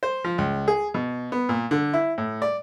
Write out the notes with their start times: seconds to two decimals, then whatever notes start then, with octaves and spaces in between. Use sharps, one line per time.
0.03 C5
0.24 F3
0.38 C#2
0.68 G#4
0.94 B2
1.32 B3
1.49 A#2
1.71 D3
1.93 E4
2.18 A2
2.42 D5